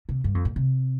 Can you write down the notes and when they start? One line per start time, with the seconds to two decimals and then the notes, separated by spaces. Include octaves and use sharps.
0.09 C3
0.24 G2
0.35 F2
0.45 A#2
0.56 C3